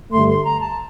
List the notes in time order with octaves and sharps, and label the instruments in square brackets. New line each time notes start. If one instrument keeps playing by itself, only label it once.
[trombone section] G2 D3 A3 [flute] C6
[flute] C6
A#5
A5